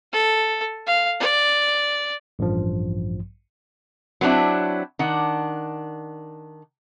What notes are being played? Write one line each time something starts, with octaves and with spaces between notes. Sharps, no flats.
A4
F5
D5
A1 G2 F3
F#3 B3 C4 D4 E4
D#3 D4 F#5